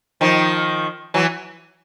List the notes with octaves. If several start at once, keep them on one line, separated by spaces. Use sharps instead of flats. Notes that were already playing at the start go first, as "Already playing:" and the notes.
D#3 F3
E3 F#3